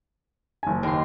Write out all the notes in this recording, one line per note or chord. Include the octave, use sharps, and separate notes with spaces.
F#1 G#5
D#2 C6